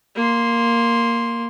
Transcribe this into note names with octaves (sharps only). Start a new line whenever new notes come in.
A#3 C6